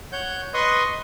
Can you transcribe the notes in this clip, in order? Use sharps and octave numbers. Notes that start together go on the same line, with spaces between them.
C#5 F#5 G6
B4 D#5 C6 C#6 D#6